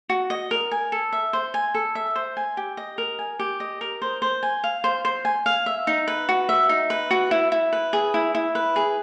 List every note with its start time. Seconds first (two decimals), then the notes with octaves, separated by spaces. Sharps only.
0.09 F#4
0.30 D#5
0.51 A#4
0.71 G#5
0.92 A4
1.13 E5
1.33 C5
1.54 G#5
1.74 A4
1.95 E5
2.16 C5
2.37 G#5
2.57 G4
2.77 D#5
2.98 A#4
3.19 G#5
3.39 G4
3.60 D#5
3.81 A#4
4.02 C5
4.22 C5
4.43 G#5
4.64 F5
4.84 C5
5.05 C5
5.25 G#5
5.46 F5
5.66 E5
5.87 D#4
6.08 B4
6.29 F#4
6.49 E5
6.69 D#4
6.90 B4
7.11 F#4
7.31 E4
7.52 E4
7.73 B4
7.93 G#4
8.14 E4
8.35 E4
8.55 B4
8.76 G#4